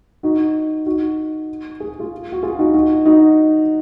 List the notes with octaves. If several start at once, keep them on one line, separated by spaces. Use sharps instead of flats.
D#4 F#4
D#4 F#4
G#4
F4 G#4
F#4
F4 G#4
D#4 F#4
D#4 F#4
D#4 F#4